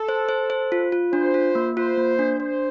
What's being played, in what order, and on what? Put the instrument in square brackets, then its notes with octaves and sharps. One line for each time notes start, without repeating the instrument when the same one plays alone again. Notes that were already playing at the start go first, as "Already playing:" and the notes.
Already playing: [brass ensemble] A4
[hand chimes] C5
C5
C5
F4
F4
[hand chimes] D4 [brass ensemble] C5
[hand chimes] F4
A#3
[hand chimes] F4 [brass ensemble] C5
[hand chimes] A#3
D4
[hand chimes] D4 [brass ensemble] C5